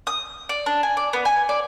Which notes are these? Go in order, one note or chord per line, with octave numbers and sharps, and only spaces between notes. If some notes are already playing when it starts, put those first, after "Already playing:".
D#6
D5
D4
G#5
D5
B3
G#5
D5